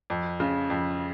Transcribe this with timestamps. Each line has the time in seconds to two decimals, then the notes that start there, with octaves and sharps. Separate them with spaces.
0.10 F2
0.40 C#3
0.70 F2